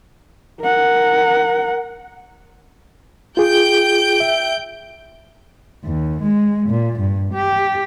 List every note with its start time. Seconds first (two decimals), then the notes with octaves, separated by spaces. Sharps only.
0.61 A#4 F#5
3.37 F4 G#4 G5 G6 D7
4.20 E5
5.84 D#2
6.23 G#3
6.69 A#2
7.00 G2
7.33 G4